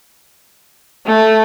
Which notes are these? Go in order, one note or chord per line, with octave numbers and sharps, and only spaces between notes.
A3